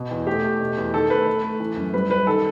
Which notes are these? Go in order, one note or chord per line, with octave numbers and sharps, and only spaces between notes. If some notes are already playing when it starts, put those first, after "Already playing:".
Already playing: B2
E2
A3 G4
A3
B2
E2
D#3 A4
A3 B4
A3
A3
E3
F#2
G3 B4
G3 B4
D#3 A4